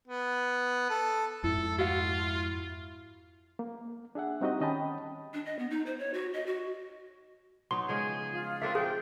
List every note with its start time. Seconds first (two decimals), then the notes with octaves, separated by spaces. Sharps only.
0.07 B3
0.90 A4
1.44 F2 G#2 E4 A4
1.78 F4 F#4 F5
3.59 A#3
4.15 D4 G#4 E5 F#5
4.41 G3 C4 D#4 F#4 G4 D#5
4.60 D#3 C#4 D#5 G5 A5 B5
5.34 D4
5.46 D#5
5.59 B3
5.70 D#4
5.86 C5
5.99 C#5
6.14 F#4
6.33 D#5
6.46 F#4
7.71 F#3 B3 D#4 C6
7.88 C#3 F3 G#3 G#4
8.32 F4
8.62 C4 D4 A4 A#4 E5
8.75 F3 C4 G#4 G5